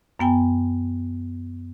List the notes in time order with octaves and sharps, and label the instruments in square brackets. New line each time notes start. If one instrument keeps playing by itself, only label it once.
[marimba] F#2 B3 G5 G#5